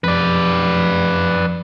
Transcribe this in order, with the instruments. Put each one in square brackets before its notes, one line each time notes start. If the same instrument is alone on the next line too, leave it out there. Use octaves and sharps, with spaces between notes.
[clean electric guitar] F2 [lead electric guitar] B4 D5